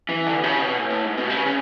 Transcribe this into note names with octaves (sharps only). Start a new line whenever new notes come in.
E3
D3
B2
C#3
B2
A2
A2
G#2
B2
C#3
C#3